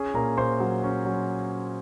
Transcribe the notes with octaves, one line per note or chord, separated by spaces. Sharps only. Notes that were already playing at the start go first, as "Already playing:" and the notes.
Already playing: C#4 G#4 G#5
A#2 A#4 A#5
A#2 C5 C6
F#3
C#4
F#3